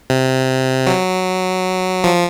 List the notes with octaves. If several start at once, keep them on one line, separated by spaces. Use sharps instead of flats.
C3
F#3
F3